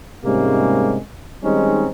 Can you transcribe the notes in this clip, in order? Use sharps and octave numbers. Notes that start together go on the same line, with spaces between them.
G#2 C3 G3 G#3 A#3 C#4
D#3 G3 G#3 C4 C#4 D#4